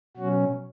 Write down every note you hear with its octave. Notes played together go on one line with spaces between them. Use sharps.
B2 F#3 C#4 F#4